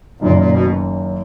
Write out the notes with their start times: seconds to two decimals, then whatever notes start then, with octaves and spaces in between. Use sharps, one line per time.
0.21 F#1 F#2 A#2 D#3
0.37 A#2
0.52 B2